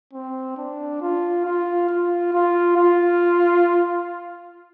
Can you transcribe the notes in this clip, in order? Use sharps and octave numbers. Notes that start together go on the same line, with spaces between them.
C4
D4
F4
F4
F4
F4
F4